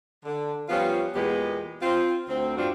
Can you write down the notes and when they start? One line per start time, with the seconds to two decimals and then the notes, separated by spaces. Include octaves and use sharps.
0.25 D3
0.69 F3 G3 B3 C#4 F4
1.14 E2 A#2 G#3 B3 G4
1.82 C4 F4
2.29 D2 C4
2.57 G2 C4 D4 F4 F#4